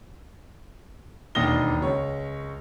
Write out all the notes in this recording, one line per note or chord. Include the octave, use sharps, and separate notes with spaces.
E1 D#2 D4 D#6 A#6 G7
C#2 C#5